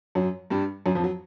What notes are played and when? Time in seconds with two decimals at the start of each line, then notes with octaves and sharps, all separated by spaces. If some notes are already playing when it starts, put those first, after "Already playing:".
0.15 F#2 F#3
0.50 G2 G3
0.86 F#2 F#3
0.95 F2 F3
1.04 F#3